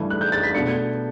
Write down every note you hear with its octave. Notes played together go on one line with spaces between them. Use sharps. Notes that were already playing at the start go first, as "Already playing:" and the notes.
Already playing: G2 E3 A3
F#6
G6
A6
B6
B2 A3 D4 C#7